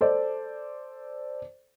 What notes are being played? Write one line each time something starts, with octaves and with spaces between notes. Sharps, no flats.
A4 C5 D5